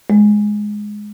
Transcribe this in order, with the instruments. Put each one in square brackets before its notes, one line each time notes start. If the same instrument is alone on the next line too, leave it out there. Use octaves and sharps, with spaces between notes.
[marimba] G#3